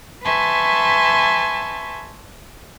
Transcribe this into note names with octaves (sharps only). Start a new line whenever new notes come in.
B4 E5 G#5 A5 C6 C#6